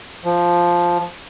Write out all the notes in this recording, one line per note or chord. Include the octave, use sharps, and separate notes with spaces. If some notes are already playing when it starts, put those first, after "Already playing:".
F3